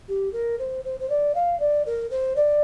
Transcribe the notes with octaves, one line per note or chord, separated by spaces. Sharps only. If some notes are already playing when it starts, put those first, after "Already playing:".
G4
A#4
C5
C5
C5
D5
F5
D5
A#4
C5
D5